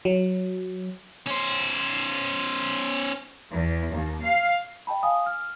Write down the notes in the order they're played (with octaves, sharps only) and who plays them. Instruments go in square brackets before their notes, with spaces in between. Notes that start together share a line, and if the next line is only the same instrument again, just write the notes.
[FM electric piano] F#3
[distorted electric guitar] C#4 C5
[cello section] E2
D#2
F5
[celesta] D#5 G5 A5 B5
F5 G#5 D#6
F6